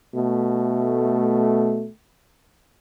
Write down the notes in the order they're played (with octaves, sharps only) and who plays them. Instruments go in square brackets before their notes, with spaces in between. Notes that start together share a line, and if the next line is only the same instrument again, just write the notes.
[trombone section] B2 A3